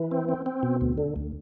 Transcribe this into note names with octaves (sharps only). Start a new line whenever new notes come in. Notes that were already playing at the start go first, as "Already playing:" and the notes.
Already playing: E3
C4
C4
C4
B2
D2
D3
D2